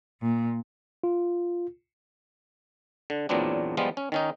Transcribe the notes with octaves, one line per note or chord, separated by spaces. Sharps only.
A#2
F4
D3
E2 A#2 F#3 B3 C4 D4
F3 G3 G#3 B3 F4
C#4
D#3 C#4 D#4